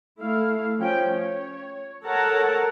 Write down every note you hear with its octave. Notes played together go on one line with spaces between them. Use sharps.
A3 E4 F5
F3 C#4 G5
C#5
A4 A#4 C#5 F#5 A5 A#5